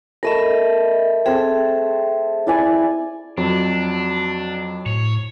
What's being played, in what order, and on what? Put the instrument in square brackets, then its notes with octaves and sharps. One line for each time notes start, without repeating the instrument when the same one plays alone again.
[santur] A3 B5 [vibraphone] A#4 D#5 E5
[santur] C4 A4 [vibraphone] G#4 E5
[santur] E4 D5 G#5
[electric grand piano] F2 F#3 [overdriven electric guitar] D4
[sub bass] A2 [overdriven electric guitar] C#5